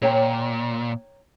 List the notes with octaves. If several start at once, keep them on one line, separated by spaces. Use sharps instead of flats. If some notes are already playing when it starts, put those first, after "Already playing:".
A#2 C#5 G5 A#5